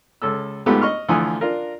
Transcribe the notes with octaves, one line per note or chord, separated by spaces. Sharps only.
C#2 A4 E6
G#2 A3 B3 F4 G4
D#5 C#6 F6
D2 E3 F3 A4 G#5 D#6
D4 F4 A#4